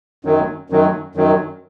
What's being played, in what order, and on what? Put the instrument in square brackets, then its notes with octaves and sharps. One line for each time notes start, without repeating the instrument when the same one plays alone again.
[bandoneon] F#2 D#3 F#3
F#2 D#3 F#3
F#2 D#3 F#3